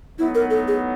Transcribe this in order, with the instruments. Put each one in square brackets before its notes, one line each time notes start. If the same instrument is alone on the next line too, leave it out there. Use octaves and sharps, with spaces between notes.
[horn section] A2 F#3 B3 D#4 [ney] E4
[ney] A#4
A4
G#4